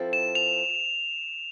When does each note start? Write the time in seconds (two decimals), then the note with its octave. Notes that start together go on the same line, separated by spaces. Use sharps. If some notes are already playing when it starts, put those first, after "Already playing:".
Already playing: F3 C4 E4 A4
0.13 E7
0.35 F7